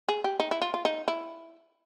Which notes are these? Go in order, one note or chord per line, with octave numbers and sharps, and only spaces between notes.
G#4
G4
D#4
E4
F4
F4
D#4
E4